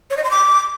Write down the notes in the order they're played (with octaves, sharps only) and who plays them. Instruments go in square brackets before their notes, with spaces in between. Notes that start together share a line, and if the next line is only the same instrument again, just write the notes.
[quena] C#5
D#5
C6
D6